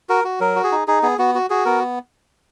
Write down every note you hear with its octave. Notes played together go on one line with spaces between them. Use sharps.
F#4 A#4
F#4
F#3 A#4
F#4
G#4
D#4
D#4 G#4
B3 G#4
B3 F#4
F#4
F#4 G#4
B3 A#4